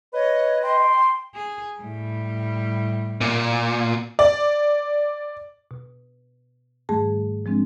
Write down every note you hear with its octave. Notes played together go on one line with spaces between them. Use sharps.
B4 C#5 D#5
G5 C6
G#4
A2 G3
A#2
D5
B2
G#2 D#3 G3 A3 G#4 A5
F3 G#3 C4 D4